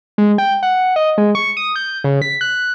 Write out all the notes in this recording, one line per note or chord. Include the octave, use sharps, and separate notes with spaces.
G#3
G5
F#5
D#5
G#3
C#6
D#6
G6
C#3
B6
F#6